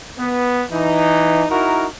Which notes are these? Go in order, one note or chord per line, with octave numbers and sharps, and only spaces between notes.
B3
E3 D#4
D#4 E4 F#4 A#4